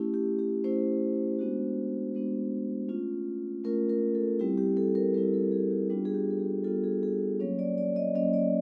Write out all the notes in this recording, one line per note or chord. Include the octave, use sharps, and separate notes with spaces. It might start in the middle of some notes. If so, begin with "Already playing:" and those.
Already playing: A3 C#4 E4 G4
G4
G4
A3 C#4 E4 C5
G#3 B3 D4 F#4
G#3 B3 D4 F#4
A3 C#4 F4
A3 C#4 F4 A#4
A#4
A4
G3 C4 E4 G4
G4
A4
A#4
G3 C4 E4 A#4
A4
G#4
G4
G3 B3 D4 F4 G4
G#4
G4
A4
G#4
G3 B3 D4 F4 A4
G#4
G#4
F#3 A#3 C#4 C#5
D5
D5
D#5
F#3 A#3 C#4 D#5
D5